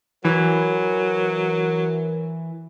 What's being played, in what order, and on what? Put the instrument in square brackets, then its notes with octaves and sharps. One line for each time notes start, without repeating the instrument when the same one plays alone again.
[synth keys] E3 [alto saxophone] F#3 [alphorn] A#4